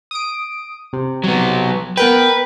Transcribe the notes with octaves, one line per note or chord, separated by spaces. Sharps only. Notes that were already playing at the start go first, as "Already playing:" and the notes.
D#6 D7
C3
F#3 B3
B3 A#4 B4 G5